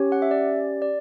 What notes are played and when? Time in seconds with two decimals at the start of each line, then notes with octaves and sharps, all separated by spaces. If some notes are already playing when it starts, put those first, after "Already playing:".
Already playing: C#4 G4 C#5
0.12 F#5
0.22 E5
0.31 D5
0.82 D5